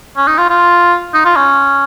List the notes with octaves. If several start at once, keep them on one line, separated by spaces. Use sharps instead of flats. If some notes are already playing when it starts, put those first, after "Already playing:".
C#4
D#4
F4
F4
D#4
F4
C#4